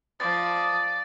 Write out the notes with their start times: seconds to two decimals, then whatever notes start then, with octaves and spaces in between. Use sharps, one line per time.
0.20 F3 D5 D#6 A6